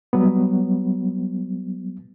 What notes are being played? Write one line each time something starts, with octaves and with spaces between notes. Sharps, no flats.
F#3 G3 B3